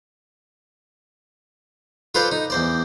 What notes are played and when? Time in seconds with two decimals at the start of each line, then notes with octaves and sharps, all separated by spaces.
2.15 F4 A4 B4 C5 D5 F5
2.31 D#4
2.50 E2 C5 D5